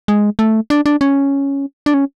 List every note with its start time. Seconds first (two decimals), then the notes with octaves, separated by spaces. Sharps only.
0.08 G#3
0.39 A3
0.70 D4
0.86 D4
1.01 C#4
1.86 D4
1.94 C#4